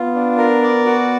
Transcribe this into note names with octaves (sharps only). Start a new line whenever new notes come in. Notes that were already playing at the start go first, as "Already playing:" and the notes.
Already playing: B3 F4
D4
A#4
D5
F#4